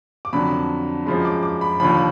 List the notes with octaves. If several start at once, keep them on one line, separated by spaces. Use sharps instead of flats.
D6
F2 D3 F#3 B5
F#2 F3 G#3 B5
D6
D6
B5
D#2 D3 F3 B5